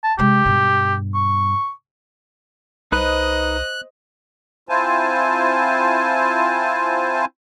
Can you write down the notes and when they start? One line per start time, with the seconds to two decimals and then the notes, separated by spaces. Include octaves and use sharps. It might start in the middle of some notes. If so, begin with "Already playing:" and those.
0.03 A5
0.19 C3 G#3 G4
0.46 G2 B2
1.14 C#6
2.92 C2 D#4 B4 C5 D#5 F#6
4.69 C4 E4 F4 C5 G#5 A5